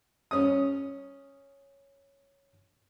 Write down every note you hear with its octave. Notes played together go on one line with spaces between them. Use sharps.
C#4 D#6